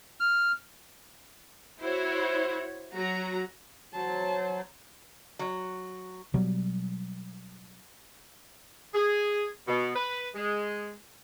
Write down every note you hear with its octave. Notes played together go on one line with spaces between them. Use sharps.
F6
E4 F#4 C5 C#5
F#3 F#4 A#5
F#3 C5 A5
F#3
B2 F#3 G3
G#4
B2
B4
G#3